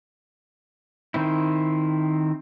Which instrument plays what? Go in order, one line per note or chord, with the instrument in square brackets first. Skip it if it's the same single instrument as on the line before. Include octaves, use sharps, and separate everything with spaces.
[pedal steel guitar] D#3 C4 E4